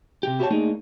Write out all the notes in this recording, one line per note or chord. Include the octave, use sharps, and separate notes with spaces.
C3 G4
E4 F#4 G4 A#4 C#5 A5
A3 A#3 D4 D#4 G#4